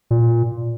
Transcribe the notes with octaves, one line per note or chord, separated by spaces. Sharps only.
A#2